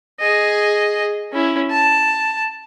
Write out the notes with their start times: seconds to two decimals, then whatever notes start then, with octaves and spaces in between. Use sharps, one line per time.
0.20 G#4 D#5
1.33 C#4 E4
1.71 A5